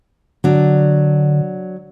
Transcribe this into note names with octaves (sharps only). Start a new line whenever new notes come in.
D3 F#3 D4